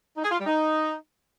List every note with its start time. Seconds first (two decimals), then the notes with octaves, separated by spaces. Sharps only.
0.17 D#4
0.24 G#4
0.31 F4
0.39 G3
0.46 D#4